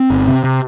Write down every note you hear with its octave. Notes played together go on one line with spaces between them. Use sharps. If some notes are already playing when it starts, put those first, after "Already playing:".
Already playing: C4
G1
C3
C3